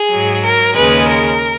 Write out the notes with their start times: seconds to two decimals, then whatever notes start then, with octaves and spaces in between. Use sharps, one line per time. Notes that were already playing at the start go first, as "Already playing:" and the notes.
Already playing: G#4
0.11 G#2 F#3
0.44 A#4
0.75 D#2 C#3 G#3 B4
1.07 A#4